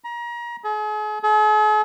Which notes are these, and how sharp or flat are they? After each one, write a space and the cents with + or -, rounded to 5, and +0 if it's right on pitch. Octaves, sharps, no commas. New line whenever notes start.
A#5 +30
G#4 +40
G#4 +45